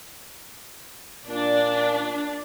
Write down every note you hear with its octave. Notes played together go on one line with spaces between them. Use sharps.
A#2 D4